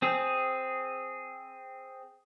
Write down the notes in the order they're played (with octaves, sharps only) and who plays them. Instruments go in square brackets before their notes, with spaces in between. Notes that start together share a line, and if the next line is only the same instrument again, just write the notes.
[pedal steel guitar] C4 G#4